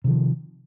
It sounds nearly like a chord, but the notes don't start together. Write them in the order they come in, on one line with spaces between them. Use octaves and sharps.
C3 D#3 F3